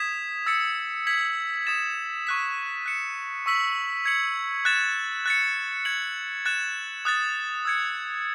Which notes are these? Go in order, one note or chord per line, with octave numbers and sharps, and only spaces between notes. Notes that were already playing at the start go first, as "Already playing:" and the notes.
Already playing: D#6 G#6 B6 E7
E6 A6 C#7
G#6 B6 F#7
D#6 A6 E7
C#6 F#6 B6
F#6 C#7 E7
C#6 E6 B6 F#7
G#6 C#7 F#7
F#6 A6 E7
F#6 A6 C#7
G#6 C#7 F#7
F#6 A6 E7
D#6 F#6 A6
E6 G#6 C#7